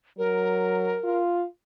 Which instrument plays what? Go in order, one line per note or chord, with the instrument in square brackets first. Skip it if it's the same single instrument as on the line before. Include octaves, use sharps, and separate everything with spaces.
[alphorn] F#3 [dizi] A#4
[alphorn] F4